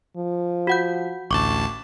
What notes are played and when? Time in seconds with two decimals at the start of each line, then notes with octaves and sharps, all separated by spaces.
0.17 F3
0.67 F#4 F#5 G6
1.31 A1 D2 A5 C#6 D6